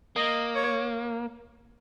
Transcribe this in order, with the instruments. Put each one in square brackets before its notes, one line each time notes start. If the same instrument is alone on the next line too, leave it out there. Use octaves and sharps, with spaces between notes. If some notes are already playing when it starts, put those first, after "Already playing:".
[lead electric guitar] A#3 [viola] D#5
[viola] C#5